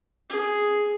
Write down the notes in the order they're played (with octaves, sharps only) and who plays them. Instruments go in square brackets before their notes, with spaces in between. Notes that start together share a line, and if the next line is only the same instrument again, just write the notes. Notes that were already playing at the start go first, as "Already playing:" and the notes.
[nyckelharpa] G#4